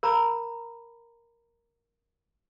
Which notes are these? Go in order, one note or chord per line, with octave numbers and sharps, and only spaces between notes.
A#4 A#5 B5